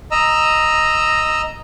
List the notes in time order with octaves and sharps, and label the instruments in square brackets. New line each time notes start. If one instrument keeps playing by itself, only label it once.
[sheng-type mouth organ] D#5 A#5 E6